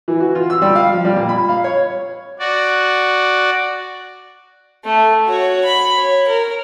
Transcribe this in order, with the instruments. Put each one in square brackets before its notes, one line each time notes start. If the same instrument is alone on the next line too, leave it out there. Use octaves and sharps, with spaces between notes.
[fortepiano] E3
F#4
F4
E6
G3
F5
F3
G3
A#2
B5
F5
C#5
[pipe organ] F#4 D5
[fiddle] A3
F#4 C#5
B5
C#5
A#4